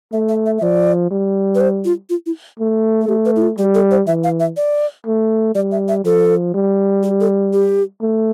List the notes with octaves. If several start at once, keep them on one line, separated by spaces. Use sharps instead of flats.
A3 E5
E5
E5
E5
F3 D5
G3
B4
C5
F4
F4
E4
A3
A4
A3 G4
B4
E4
F4
G3 G4
A4
C5
E3 E5
F5
E5
D5
A3
G3 D5
E5
E5
F3 A4
G3
G4
A4
G4
A3